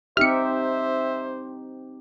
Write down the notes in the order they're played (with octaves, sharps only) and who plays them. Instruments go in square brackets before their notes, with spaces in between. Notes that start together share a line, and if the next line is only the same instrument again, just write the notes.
[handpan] C4 D#4 G4 [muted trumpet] C5 [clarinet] E5 [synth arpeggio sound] F6 C#7